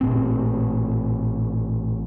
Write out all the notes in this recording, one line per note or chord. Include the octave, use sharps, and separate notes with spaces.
A1 A#2 C4